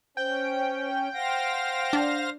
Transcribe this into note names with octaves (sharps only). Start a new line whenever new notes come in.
C#4 C5 G5
C5 F5 F#5 A#6
D4